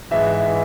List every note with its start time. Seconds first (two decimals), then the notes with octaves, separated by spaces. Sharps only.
0.11 G#2 E3 E5
0.47 E3